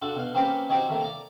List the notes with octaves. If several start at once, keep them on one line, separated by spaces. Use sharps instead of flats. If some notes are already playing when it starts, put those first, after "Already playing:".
D4 F4 F#4 A4
B2 F5
A#3 C4 C#4 G4 B4 F5
C4 D#4 F#4 G4 C#5 D#5
D#3 A3 A#3
D5 A#5